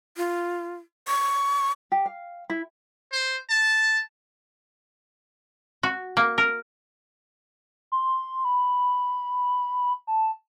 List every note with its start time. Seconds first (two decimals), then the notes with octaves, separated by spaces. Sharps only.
0.17 F4
1.08 C#6
1.92 G4
2.06 F5
2.50 E4
3.12 C5
3.50 A5
5.83 F#4
6.17 A#3
6.38 A#4
7.92 C6
8.45 B5
10.07 A5